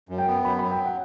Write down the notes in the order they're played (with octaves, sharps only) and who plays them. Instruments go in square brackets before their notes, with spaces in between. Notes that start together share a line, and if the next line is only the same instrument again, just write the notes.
[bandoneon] F#2
[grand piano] G5
[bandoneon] B3
[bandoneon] F#2 [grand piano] B5
[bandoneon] F#3 [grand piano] B5
[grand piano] G5
F#5